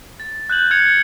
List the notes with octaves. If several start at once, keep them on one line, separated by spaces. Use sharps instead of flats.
A6
F#6 G6 F#7
F6 G#6 C#7 F7